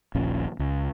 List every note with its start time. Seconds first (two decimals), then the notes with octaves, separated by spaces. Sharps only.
0.15 D#1 A#1 A#2 C#4
0.59 C#2